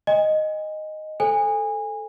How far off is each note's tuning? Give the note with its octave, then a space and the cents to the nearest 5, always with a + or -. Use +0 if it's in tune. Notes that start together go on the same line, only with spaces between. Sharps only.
D#5 -5 G#5 -35
A4 +0 C5 +25 G#5 -25